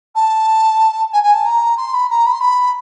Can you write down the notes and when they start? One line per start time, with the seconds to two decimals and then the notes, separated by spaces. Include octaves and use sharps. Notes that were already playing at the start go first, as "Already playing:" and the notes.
0.15 A5
1.13 G#5
1.23 G#5
1.33 A5
1.45 A#5
1.77 C6
1.94 B5
2.10 A#5
2.26 B5
2.33 C6
2.40 B5